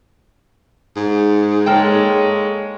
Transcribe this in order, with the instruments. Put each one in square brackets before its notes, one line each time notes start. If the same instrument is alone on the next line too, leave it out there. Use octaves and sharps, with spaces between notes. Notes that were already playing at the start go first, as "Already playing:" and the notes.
[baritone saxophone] G#2
[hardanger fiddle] G#3 C#5 [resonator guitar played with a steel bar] A#3 A4 G5